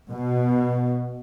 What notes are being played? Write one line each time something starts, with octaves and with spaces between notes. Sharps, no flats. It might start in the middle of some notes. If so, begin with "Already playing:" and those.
B2